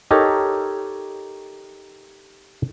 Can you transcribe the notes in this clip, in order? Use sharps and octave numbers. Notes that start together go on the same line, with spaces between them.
D#4 G4 A4 A#4 C#5 D#5